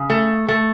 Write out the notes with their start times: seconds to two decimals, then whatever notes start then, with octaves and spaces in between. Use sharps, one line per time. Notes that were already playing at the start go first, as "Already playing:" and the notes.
Already playing: C#3
0.10 A3
0.48 A3